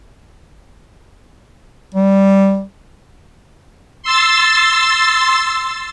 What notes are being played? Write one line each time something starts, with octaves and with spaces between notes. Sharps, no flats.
G3
C6 E6 A6